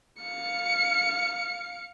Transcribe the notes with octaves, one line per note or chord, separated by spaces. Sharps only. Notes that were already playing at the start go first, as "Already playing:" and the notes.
F5 C#7